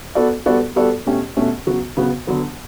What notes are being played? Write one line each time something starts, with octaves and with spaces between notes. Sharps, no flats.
B3 F#4 A4 D5
G3 B3 F#4 A4 D5
G3 B3 F#4 A4 D5
B2 A3 C#4 G4
B2 A3 C#4 G4
C#3 F#3 B3 F#4
C#3 F#3 B3 F#4
D3 F#3 B3